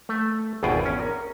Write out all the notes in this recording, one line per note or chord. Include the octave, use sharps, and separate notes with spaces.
A3
G#1 E2 B2 F4 G#4 G5
C#4
A#4